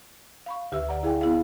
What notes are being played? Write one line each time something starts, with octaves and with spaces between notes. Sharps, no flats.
F5 B5 C#6
D2 D3 G4 B4 E5 E6
D5 F#5 A#5
E4 G#4 F5 G5 G#5
B3 E4 G#4 F5